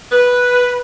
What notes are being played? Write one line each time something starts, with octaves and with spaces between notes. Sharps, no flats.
B4